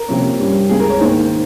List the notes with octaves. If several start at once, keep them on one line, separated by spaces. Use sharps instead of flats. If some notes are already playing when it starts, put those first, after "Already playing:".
Already playing: A#4
C3 F3 A#3 C#4
G2 G3 C#4
C#2 C#3 G#3 G#4
A#4
C#5
G#2 D#3 A#3 D#4 C5